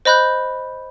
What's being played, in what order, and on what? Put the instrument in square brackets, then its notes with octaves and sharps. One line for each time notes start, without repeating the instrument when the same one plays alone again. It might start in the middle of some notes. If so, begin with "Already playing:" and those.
[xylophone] C5 D#5 B5 F#6 G6